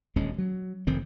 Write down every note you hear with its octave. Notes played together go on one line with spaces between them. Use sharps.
D#1 D2 G#3 C#4
F#3
F1 F2 D#3 C4